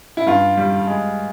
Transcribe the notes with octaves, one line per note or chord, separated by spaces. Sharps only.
E4
G2 F4
G3
G#3